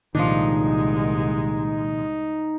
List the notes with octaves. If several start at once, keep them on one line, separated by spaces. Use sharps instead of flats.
C2 A#2 D#3 F3 G#3 D4 D#4